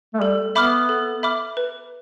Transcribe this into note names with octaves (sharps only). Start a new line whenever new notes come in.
A3
G3 A4
B3 E5 B5 D6 F6
A4
E5 B5 D6 F6
B4